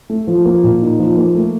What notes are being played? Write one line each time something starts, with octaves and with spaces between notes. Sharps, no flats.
A3
F3
A#3
A#2
D#4
F3
A#3
A3